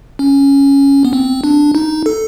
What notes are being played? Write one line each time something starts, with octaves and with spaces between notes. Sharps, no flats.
C#4
B3
C4
D4
D#4
A4